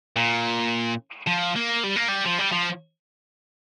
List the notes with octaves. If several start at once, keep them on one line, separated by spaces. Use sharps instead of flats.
A#2
F3
A#3
G3
A#3
G3
F3
G3
F3